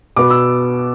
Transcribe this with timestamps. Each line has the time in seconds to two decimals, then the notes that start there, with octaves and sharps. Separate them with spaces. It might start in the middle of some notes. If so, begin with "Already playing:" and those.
0.16 B2 B3 D6
0.30 E6